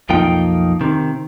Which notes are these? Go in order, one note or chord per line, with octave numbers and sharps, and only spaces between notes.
B1 F2 F3 A#3 D#4 G5
C3 D#3